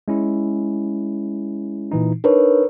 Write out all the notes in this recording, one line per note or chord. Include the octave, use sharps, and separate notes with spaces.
G#3 C#4 E4
A#2 E3 D#4
D4 D#4 A#4 B4 C#5